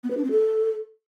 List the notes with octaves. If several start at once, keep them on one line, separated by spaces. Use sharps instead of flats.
B3
B4
D4
C4
A4